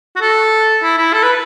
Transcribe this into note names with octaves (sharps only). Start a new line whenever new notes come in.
F#4
A4
E4
E4
A4
B4